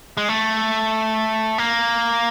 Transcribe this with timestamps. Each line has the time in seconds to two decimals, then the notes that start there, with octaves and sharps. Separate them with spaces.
0.17 G#3
0.29 A3
1.58 A#3